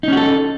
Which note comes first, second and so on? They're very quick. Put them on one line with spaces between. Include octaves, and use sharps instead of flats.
D#4 C#4 F#4 A4